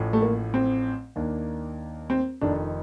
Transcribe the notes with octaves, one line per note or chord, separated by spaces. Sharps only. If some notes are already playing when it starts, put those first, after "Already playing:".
Already playing: A1 A2 F3
A3
A#3
C4
D#2 D#3 A#3 D4
C4
F1 F2 D#3 D4